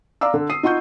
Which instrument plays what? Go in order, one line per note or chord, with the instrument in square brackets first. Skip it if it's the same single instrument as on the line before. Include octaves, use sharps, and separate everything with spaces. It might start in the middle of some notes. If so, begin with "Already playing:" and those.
[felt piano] D5 F5 A#5 D6 E6
D3
D#6 C7 D#7
D#4 F4 F#5 C#6 G6